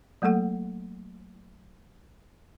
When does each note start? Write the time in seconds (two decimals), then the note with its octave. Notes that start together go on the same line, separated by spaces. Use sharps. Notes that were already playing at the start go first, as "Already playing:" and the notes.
0.22 F#3 A3 A#3 A4 F#5